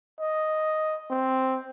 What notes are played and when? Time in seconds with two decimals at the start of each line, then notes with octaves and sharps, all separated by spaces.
0.20 D#5
1.10 C4